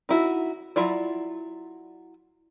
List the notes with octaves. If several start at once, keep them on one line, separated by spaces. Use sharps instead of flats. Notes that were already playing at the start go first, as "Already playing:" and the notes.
D#4 E4 F#4
F#3 E4 F4 D5